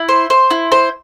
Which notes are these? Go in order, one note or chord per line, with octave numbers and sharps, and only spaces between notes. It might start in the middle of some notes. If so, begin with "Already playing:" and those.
Already playing: E4
C5
C5
E4
C5